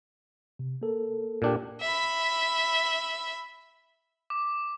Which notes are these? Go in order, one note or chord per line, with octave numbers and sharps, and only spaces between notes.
C3
A#3 A4 A#4
A#2 D4 G4
E5 B5
D6